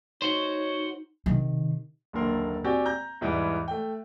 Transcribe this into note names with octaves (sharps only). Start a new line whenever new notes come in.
D#4 F#4 C5 C#5
C3 D#3
F#1 D#2 D3 A4 A#4 C6
C4 F#4 G4 D5 G5 G#5
A#5 G6
E2 G#2 E3 G3 B3
A3 G5